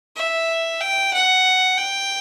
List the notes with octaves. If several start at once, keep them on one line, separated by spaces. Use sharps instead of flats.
E5
G5
F#5
G5